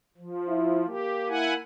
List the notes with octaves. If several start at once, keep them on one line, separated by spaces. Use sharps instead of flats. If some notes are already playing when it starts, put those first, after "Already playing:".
F3
E4
A#3 G4
E4 F#5 G#5